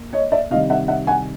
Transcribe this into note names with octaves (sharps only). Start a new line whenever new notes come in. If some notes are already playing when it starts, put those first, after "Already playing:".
Already playing: A#3
C#5 D#5
D5 E5
C3 D#3 G3 D#5 F5
E5 F#5
E5 F#5
F#5 G#5